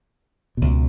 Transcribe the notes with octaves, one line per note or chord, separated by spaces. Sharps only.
C#2 B2